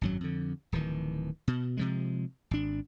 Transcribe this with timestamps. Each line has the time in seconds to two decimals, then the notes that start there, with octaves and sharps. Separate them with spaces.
0.01 G#1 F#2 F#3
0.21 F2 D3
0.72 D1 D#3 E3
1.48 B2
1.77 C3 F3 G#3
2.51 G#1 D4